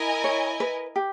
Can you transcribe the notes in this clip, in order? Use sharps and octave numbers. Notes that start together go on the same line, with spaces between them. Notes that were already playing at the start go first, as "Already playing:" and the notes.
Already playing: E4 A#4 D#5 G#5
C#5
B4
G4